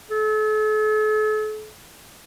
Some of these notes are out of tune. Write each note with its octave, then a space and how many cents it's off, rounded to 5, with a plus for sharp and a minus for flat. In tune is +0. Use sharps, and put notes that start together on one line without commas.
A4 -40